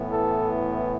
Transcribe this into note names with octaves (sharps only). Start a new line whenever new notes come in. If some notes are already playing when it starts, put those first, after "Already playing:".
Already playing: A2 E3 B3
A4